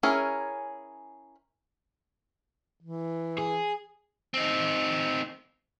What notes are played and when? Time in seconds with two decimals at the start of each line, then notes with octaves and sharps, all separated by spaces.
0.03 C#4 E4 G#4 A#4 C#5
2.81 E3
3.38 G#4
4.34 C4 D#4